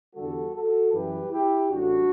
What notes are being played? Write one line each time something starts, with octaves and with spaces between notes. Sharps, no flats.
E2 D3 G3 F#4 A4
F#4 A4
F#2 E3 G3 G4 B4
E4 G4
A1 A2 G3 D4 F#4